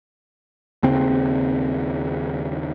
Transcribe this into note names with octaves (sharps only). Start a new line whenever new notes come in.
D#2 C#3 C4